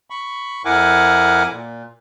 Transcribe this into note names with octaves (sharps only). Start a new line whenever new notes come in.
B5 C#6
F2 E4 A#4 F#5 G#5 D6
A#2